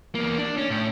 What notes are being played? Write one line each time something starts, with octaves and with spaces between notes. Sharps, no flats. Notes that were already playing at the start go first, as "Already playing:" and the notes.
E2 A#3
D4
C#4
A2